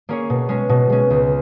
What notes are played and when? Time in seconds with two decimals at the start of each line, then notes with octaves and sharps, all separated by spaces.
0.09 A#3 C#4 G#4 C#5
0.30 B2
0.49 G#3 C#4
0.69 B2
0.90 G#3 C#4
1.10 C#2